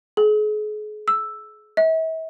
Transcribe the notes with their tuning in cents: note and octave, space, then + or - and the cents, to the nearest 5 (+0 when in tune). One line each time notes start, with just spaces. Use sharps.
G#4 +40
E6 +0
E5 -40